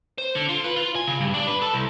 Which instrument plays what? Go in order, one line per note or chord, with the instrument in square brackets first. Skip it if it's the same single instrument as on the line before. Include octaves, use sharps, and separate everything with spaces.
[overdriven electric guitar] C5
D3
F4
B4
F4
G#5
C#3
G2
D4
B4
A4
C2